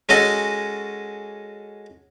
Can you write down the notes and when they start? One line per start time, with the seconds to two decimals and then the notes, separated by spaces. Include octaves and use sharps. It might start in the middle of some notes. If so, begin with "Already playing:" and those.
0.09 G#3 C#4 F#4 A4 D#5